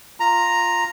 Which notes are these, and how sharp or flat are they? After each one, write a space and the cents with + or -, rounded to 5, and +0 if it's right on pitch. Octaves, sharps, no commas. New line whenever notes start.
F4 +0 A#5 +0